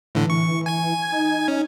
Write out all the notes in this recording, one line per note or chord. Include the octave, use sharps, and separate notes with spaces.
A2 D3 E3
C#6
G#5 G#6
D#4
C#4